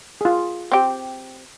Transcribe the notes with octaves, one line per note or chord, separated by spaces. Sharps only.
F4 G#4
C4 G4